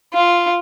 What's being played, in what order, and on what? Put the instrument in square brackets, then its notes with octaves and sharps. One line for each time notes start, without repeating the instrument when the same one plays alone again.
[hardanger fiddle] F4